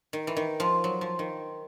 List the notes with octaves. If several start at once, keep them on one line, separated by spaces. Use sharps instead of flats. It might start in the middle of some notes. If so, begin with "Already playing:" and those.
D#3
E3
D#3
F3
F#3
F3
D#3